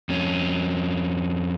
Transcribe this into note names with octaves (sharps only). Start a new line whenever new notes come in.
F2 C#4